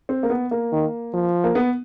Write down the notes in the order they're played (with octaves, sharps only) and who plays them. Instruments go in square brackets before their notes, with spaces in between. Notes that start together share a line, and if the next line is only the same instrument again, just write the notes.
[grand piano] C4
A#3
B3
A#3
[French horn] D#3
F3
[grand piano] A#3
B3